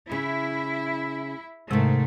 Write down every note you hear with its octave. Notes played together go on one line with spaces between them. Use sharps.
C#3 E4
G#2 C3 D#3 G#3 A3